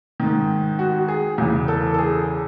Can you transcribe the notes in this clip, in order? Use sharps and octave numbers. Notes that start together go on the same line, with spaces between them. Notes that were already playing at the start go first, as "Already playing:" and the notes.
G#2 D#3
F#4
G#4
E2 C#3 E3
A4
A4
G#4